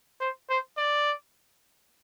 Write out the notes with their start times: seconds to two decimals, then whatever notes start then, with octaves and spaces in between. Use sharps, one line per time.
0.20 C5
0.49 C5
0.77 D5